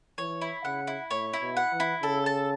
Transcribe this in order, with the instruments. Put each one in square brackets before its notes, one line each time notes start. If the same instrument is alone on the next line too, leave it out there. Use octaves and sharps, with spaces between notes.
[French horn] E3 [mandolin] C#5
[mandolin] E4
[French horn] C#3 [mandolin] F#5
[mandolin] E4
[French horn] A2 [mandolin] C#5
[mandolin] E4
[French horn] B2
[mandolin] F#5
[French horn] E3
[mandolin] E4
[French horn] C#3 [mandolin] A4
[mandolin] A5